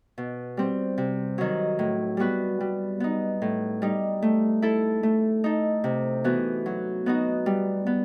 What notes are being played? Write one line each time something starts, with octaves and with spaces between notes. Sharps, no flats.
B2
G3 C4
C3
D#3 F#3
A2
G3 B3 F#4 B4
G3
B3 D#4
A2
G3 D#4
A3
E4 A4
A3
D#4 A4
C3
E3 B3 F#4
F#3
B3 D#4 F#4
G3
B3